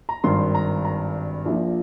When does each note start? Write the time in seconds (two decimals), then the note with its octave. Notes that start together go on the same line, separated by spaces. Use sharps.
0.09 A#5
0.24 G#1 G2 D#3 C6
0.55 A#5
0.85 A#5
1.45 A#1 A#2 F3